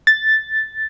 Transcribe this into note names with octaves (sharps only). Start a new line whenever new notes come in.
A6